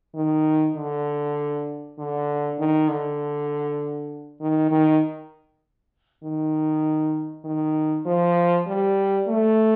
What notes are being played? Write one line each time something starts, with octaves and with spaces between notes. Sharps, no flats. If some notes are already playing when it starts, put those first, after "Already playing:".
D#3
D3
D3
D#3
D3
D#3
D#3
D#3
D#3
F3
G3
A3